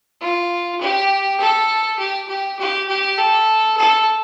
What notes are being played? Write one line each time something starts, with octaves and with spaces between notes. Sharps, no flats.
F4
G4
A4
G4
G4
G4
G4
A4
A4